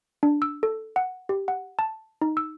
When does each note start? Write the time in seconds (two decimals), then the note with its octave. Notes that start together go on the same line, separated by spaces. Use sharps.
0.23 D4
0.42 E6
0.63 A4
0.96 F#5
1.29 G4
1.48 F#5
1.79 A5
2.22 D#4
2.37 E6